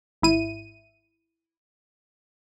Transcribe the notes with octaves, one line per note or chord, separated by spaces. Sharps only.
G#1 E4 D#7